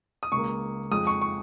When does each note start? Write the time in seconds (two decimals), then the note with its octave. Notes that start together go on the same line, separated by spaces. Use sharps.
0.23 D#6
0.32 C#2 C#3 A#3 C#6
0.91 F2 F3 G#3 D#6
1.07 C#6
1.21 C#6